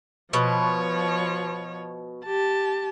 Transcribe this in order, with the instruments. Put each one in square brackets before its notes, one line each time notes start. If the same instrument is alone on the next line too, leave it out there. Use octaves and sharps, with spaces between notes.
[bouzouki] B2 [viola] F3 C#5
[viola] G4 A5